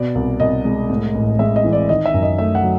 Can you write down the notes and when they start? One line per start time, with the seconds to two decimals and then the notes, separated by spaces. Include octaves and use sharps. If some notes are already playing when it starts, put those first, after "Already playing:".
Already playing: B2 D5
0.15 C2
0.40 C2 D#5
0.65 G#3
0.90 A2
1.15 A1
1.39 G#3 E5
1.56 D#5
1.64 E3
1.73 D5
1.89 D#3 D#5
2.06 E5
2.14 F#2
2.23 D#5
2.38 A3 E5
2.55 F#5
2.63 F#3